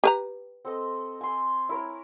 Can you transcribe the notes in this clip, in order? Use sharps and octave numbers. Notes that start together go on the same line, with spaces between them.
G4 B4 A#5
C4 A4 D#5
G#5 C6
E4 A#4 C#5